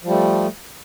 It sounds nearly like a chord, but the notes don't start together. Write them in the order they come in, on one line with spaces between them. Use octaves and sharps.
F3 G3 A3